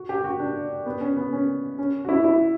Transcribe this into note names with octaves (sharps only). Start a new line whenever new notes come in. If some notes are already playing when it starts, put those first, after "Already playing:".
Already playing: F#4
G4
F#4
D4
B3
C#4
B3
C#4
C#4
F#4
E4
E4